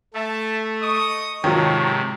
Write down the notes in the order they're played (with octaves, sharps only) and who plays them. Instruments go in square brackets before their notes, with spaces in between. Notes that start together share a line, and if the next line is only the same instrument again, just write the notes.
[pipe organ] A3 [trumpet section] E5 A5
[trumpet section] D#5 C#6 D#6
[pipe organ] G#2 C3 [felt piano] D#3 F3 F#3 [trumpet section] A4 A#4 C#5